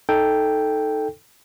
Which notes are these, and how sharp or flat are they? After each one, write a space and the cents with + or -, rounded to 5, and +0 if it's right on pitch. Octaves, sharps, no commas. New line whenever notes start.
D#4 +0 A4 +0 G5 +0